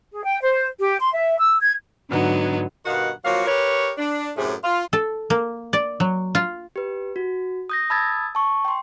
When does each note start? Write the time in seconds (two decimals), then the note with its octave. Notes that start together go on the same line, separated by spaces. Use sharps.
0.12 G#4
0.26 G5
0.42 C5
0.79 G4
1.01 C6
1.15 E5
1.39 E6
1.60 G#6
2.09 G#2 D3 F#3 B3 D#4
2.86 G2 B2 D#3 F#4 F5 F#5
3.25 F3 F#3 A#3 F#4 C#5 F5
3.45 G4 A#4 B4 C#5
3.97 D4
4.36 F#2 A2 C3 A3 G#4
4.63 F4
4.93 A4
5.30 A#3
5.73 D5
6.00 F#3
6.35 F4
6.76 G4 B4
7.16 F#4
7.70 D#6 G6 A#6
7.90 A5 B5 D#6 E6 G#6 A6
8.35 A5 C#6
8.65 G5 C6